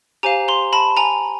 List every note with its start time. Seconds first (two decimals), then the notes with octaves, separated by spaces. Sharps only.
0.23 G4 C5 F5 G#5 A#5
0.48 A#5 C6
0.73 A5 B5
0.97 G#5 A#5